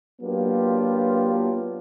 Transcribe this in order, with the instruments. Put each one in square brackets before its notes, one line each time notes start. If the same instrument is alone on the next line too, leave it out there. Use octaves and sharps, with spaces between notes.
[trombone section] F#3 A#3 B3 D4 F4 G4